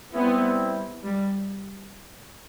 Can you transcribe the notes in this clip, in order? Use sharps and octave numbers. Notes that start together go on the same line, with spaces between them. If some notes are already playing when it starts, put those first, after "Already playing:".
G3 B3 C4 E4
G3